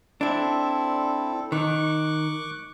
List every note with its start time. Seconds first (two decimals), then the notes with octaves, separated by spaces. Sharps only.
0.21 C4 D4 E4 A4
1.52 D#3 C#6 D6 F#6